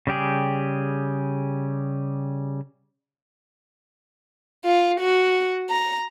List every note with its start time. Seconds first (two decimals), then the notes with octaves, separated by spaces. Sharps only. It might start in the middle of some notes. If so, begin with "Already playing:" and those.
0.07 C#3 G3 G4 G#4
4.65 F4
5.00 F#4
5.70 A#5